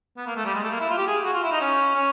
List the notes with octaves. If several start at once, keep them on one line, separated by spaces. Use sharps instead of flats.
B3
A#3
A3
G3
G#3
A3
A#3
E4
F4
G4
G#4
F#4
F4
E4
D#4
C#4
C#4